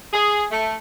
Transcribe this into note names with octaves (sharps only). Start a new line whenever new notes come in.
G#4
A3